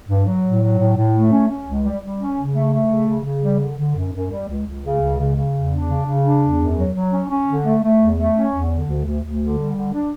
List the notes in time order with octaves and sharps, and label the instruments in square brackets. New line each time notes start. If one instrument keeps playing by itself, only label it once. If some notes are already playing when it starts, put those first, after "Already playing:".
[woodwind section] G2
F#3
A2
F#3
A2
A2
A3
C#4
C#4
C#2
G3
G3
C#4
C#3
A3
A3
C#3
C#3
C#3
G3
D3
D3
F#2
F#2
G3
C#2
C#2
C#3
C#2
C#3
C#3
E2
D4
C#3
C#3
D4
E2
F#2
F#3
F#3
C#4
C#4
D3
A3
A3
E2
A3
C#4
E2
D3
D2
D2
D2
D3
G3
D3
D4